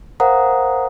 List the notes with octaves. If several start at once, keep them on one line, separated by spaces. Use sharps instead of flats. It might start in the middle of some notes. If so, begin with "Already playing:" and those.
A#4 C5 F5 F#5 A#5 D#6